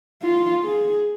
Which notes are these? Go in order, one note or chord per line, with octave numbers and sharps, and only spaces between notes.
F4
G#4